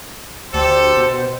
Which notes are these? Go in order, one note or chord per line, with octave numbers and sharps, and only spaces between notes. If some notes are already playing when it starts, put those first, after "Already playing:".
D2 G4 A4 C5
B2